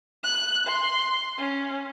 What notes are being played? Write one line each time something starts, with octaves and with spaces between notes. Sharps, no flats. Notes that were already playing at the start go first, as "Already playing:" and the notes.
F#6
C6
C#4